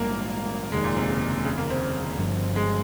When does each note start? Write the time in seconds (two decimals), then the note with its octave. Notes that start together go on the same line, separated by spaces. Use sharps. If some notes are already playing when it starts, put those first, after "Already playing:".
Already playing: A#1 G#2 G3 A#3
0.72 F1 D#2 D#3 G#3
0.84 A#2
0.97 C3
1.09 C#3
1.45 C#3
1.57 A#3
1.70 C4
2.18 G1 G2 F3
2.56 G#3